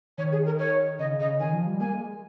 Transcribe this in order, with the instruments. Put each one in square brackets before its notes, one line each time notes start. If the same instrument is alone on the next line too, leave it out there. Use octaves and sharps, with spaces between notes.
[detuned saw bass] D#3 [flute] C#5
[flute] G#4
A#4
C#5
[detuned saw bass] C#3 [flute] D#5
[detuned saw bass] C#3 [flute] D#5
[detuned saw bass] D#3 [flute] G#5
[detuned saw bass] F3
G3
[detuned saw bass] A#3 [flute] G#5
[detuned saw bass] G#3